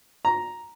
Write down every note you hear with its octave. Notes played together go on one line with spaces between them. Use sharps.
A#5